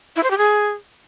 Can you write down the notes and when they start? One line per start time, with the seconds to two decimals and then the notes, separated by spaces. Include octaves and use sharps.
0.16 E4
0.23 C5
0.30 G4
0.38 G#4